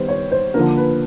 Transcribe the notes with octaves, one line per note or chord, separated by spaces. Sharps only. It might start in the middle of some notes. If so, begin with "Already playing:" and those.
Already playing: D#3 G3 B3 C5
C#5
C5
D3 F3 A#3 A#4
B4